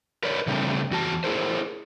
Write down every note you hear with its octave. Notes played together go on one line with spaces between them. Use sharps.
A#4 B4 C#5 D5
C#3 G3 A3 C4 D4
E2 F#4 A5
E4 G#4 A#4 C5